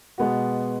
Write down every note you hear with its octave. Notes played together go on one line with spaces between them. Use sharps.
B2 G#3 B3 F#4